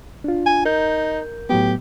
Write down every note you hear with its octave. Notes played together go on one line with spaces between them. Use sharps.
D4 F4
G#5
D#4 A#4 G6
A2 F#3 B3 G4